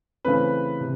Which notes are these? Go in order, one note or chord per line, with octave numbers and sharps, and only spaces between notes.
C#3 E3 A3 C4 B4
C3